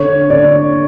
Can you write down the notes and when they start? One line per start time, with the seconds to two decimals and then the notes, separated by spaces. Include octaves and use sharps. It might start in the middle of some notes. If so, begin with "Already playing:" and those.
Already playing: D3 C#5
0.30 D3 D5